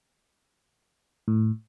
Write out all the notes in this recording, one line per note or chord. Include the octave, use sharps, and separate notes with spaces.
A2